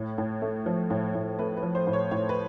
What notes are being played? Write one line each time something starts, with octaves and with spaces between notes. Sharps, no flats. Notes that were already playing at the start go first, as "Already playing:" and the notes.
Already playing: A2
A2
A3
F3
A2
A2
A3 B4
B4
F3
C5
A2
C#5
A2 C#5
B4